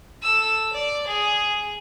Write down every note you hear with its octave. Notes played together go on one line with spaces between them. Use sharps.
A4 E6
D5
G#4